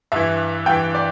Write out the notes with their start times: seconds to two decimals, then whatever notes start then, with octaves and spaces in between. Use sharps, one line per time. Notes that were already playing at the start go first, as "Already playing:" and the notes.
0.12 G2 E3 E5
0.66 G2 E3 G5
0.95 D5